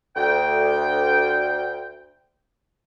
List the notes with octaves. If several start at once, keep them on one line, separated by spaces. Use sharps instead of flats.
D2 G5